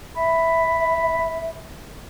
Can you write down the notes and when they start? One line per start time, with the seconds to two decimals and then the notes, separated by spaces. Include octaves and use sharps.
0.16 E5 B5